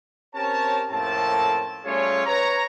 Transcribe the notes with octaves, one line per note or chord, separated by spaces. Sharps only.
C4 C#4 G4 A#4 C#5 A5
F2 A2 A#3 C4 C#4 A5
G3 A3 C#4 F4 G#4 C#5
B4 C#5 A#5